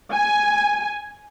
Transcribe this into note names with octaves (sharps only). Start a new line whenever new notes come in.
G#5